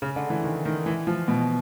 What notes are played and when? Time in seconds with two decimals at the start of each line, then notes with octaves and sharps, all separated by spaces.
0.02 C#3
0.16 D3
0.30 E3
0.44 D#3
0.65 D#3
0.86 E3
1.07 F3
1.28 B2